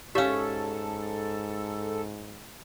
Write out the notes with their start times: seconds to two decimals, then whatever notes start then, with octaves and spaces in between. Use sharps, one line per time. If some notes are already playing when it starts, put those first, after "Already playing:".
0.15 G#2 C#4 G4 A4 C#5 E5 F5